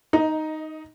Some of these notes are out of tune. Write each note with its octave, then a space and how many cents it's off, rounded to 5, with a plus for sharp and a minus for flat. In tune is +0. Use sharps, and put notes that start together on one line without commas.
D#4 +0 D#5 +25